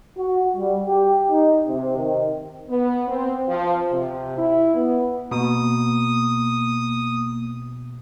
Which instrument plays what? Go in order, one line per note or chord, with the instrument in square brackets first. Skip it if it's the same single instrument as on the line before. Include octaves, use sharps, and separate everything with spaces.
[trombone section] F#4
G3
G4
D#4
C3
D#3
[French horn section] B3
C4
F3
C3
E4
B3
[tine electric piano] B2 [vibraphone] A#3 [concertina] D#6